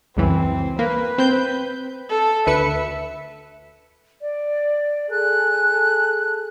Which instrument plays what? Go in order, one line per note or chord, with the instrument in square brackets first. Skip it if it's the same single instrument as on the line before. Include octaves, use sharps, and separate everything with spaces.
[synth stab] C#2 F#2 E3 [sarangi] C4
[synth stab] A#3 [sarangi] B4
[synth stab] C4 G6
[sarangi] A4
[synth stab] D2 B4 C#7 [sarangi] E5
[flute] D5
[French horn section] G#4 A4 [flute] F#6